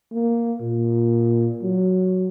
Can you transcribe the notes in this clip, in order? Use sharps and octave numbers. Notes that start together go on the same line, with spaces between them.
A#3
A#2
F#3